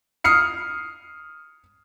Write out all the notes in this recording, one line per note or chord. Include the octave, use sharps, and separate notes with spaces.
D#6 F6 C7 C#7